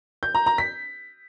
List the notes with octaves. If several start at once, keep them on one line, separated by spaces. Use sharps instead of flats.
G6
A#5
A#5
B6